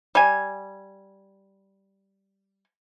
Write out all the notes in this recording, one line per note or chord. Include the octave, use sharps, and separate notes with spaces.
G3 G#5